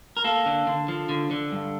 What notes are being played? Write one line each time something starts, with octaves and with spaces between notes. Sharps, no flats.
A#4
A#3 A4
D3
D3
F3
D3
D3
G2